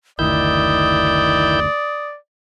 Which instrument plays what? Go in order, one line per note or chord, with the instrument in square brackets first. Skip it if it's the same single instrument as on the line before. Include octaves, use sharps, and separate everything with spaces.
[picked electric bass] F#1 D2 [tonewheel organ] D#3 E4 G6 [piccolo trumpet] D5 [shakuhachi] D#6